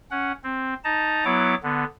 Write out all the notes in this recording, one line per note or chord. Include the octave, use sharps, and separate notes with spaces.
C#4 F#5
C4
D#4 A5 A#5
F#3 B3 E4 C#5 D6
D3 B3